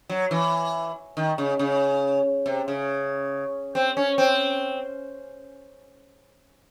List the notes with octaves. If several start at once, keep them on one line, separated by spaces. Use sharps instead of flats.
F#3
E3
D#3
C#3
C#3
C3
C#3
C4
C#4
C4